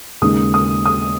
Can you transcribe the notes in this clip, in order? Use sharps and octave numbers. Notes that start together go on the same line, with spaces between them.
D#2 C#3 G#3 D#6
D#6
D#6